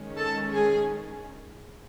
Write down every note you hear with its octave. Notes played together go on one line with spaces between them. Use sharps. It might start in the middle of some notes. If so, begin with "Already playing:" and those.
Already playing: D#3 G#3 C#4
A4 A5
G#4 G#5